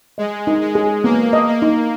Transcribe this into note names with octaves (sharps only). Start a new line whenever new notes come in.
G#3 D#5
D#4
G#3
G#4
A#3 B3
D#5
A#3
D#4